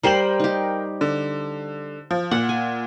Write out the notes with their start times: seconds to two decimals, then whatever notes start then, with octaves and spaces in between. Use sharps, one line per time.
0.03 G3 A#4 C5 G5 C6 F#7
0.40 D#4 G4
1.01 D3
2.11 F3
2.31 A#2 F#5
2.49 G#5